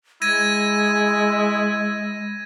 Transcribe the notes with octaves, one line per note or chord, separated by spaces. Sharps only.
G#3 E4 G#6 A#6 D#7